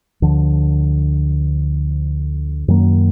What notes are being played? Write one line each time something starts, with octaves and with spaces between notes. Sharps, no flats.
D2 D3 F3
F#2 D#3 F#3 A#3